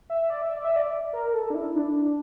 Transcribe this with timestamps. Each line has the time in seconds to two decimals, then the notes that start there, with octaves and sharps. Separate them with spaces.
0.10 E5
0.30 D5
0.42 E5
0.54 D5
0.65 E5
0.76 D5
1.13 A#4
1.33 A4
1.50 D4
1.55 E4
1.76 D4